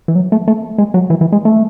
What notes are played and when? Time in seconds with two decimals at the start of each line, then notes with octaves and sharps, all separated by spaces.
0.08 E3
0.15 F#3
0.32 A3
0.48 A3
0.78 G#3
0.94 F#3
1.10 E3
1.21 E3
1.32 G#3
1.45 A3